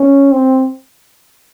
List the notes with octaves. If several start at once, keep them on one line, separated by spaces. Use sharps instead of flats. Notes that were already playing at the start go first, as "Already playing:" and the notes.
Already playing: C#4
C4